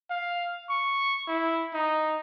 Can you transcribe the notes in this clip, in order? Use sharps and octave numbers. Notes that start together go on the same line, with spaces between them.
F5
C#6
E4
D#4